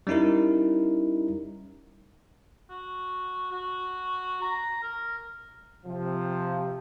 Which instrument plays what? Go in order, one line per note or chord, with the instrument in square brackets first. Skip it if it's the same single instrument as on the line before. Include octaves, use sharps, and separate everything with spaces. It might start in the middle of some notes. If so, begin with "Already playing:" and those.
[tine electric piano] G3 C#4 D#4 E4 A#4
[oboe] F#4
F#4
A#5
A#4
[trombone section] C3 F3